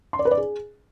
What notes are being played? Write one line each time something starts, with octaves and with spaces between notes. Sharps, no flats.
C6
D5
B4
D5
G#4